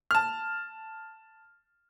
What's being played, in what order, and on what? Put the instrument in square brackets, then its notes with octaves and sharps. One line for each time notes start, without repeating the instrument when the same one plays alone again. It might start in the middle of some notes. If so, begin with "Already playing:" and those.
[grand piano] A5 F6